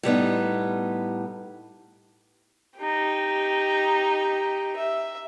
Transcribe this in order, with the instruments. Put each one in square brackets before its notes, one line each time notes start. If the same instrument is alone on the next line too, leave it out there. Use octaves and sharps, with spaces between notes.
[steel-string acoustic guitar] A2 G3 B3 D#4
[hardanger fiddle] D#4 G4
E5